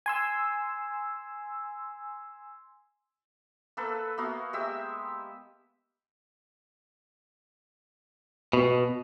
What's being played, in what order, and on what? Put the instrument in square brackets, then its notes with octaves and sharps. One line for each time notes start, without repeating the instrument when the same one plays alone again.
[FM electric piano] G#5 C6 E6
[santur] A#3 A4 B4 E6
A#3 B3 F#4 F5
G#3 G4 E5 E6
[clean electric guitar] B2